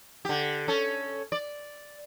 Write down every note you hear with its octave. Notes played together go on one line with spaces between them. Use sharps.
D3 G4
C#4 A4
D5